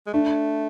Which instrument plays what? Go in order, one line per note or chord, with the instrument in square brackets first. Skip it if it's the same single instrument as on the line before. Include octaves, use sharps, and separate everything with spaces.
[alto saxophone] G#3
[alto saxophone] A3 [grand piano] D4